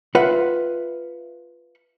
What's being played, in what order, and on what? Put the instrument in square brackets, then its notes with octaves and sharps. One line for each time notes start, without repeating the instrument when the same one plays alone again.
[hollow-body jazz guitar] F4 B4 E5 F#5